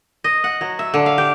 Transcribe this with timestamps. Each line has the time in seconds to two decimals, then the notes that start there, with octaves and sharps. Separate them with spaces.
0.24 D#5
0.44 F#5
0.61 F#3
0.79 E5
0.94 D3
1.06 F5
1.18 G4